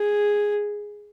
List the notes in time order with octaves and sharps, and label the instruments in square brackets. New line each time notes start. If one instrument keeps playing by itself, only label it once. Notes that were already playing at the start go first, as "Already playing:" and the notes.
Already playing: [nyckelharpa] G#4